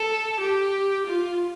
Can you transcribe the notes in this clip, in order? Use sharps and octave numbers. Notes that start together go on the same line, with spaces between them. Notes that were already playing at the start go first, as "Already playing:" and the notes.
Already playing: A4
G4
F4